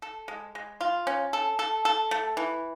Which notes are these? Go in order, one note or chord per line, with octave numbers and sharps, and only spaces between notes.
A4
G#3
G#3
F4
C#4
A4
A4
A4
A3
E3